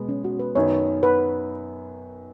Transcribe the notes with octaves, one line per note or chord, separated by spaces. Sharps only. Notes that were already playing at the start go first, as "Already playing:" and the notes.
Already playing: B2 G#3 B3
C#4
F#4
B4
F#2 D#3 B3 C#5
B4